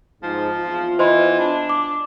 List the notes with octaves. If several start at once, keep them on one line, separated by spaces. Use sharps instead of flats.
G#2 F3
E2 C4 F4
E3 C5 D#5 C6
D4
D6